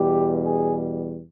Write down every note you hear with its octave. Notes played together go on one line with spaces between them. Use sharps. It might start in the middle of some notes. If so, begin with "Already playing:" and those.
Already playing: E2 B2 G3 G4
G#4